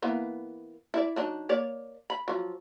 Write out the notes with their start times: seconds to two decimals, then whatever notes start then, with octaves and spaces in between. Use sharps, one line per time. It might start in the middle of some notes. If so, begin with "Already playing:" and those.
0.02 E3 A#3 B3
0.94 E4 D5
1.16 F#3 D4 D#4
1.49 A#3 C#5 D5
2.10 B5
2.28 F3 F#3